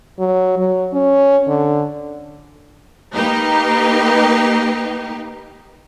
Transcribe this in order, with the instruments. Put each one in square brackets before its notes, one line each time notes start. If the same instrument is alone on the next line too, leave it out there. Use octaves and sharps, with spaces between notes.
[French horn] F#3
F#3
C#4
D3
[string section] A#3 D#4 G4 B4